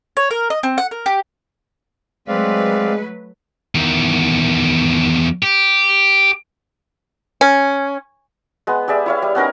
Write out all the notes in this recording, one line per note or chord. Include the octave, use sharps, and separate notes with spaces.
C#5
A#4
D#5
C4
F#5
A#4
G4
F#3 G#3 A3 C4 B4 D5 F5
E2 D#3
G4
C#4
G#3 B3
G4 G#4 D5 E5
E4 C#5 F5
G3
B3 C#4 D#4 A#4